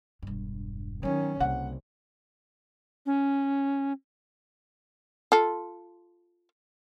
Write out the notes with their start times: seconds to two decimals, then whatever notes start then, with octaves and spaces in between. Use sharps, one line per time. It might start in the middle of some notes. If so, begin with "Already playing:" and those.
0.23 E1 G2
1.03 D#3 F#3 B3 C#4
1.40 C2 C#3 A#3 F#5
3.06 C#4
5.32 F4 A4